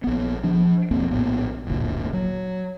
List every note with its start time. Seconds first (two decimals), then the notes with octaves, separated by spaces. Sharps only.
0.04 A#1 B3
0.44 F3 D4
0.91 B1 F2 A#3 C4
1.11 A#1 A2 B3
1.67 D1 G1 D2 A#2
2.13 F#3